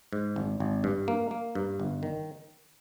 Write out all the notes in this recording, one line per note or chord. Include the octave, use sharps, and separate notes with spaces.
G#2
G#1
G#1
G2
A#3
A#3
G2
G1
D#3